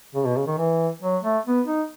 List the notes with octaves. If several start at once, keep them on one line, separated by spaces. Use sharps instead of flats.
C#3
B2
C#3
D#3
E3
F#3
A3
B3
D#4